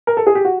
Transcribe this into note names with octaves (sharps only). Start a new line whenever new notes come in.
A#4
A4
G#4
G4
F#4